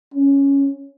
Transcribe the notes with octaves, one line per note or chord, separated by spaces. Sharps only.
C#4